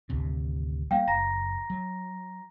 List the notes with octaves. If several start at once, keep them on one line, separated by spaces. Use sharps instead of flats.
G#1 D2 C3
G3 A#3 F5 G5
F#1 A#5 A#6
F#3